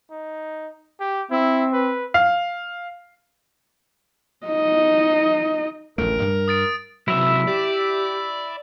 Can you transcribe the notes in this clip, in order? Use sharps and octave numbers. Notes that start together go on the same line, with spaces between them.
D#4
G4
C4 E4
B4
F5
D#4 D#5
A1 D2 A3 A#4 D7
G2 G3
D#6 A6 D7
C3 F#3 E4 E5
G4 D5